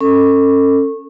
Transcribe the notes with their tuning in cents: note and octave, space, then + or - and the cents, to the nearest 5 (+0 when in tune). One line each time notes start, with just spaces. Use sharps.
C#4 -20 A4 +30